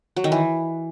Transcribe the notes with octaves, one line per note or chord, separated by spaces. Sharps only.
F#3
D#3
E3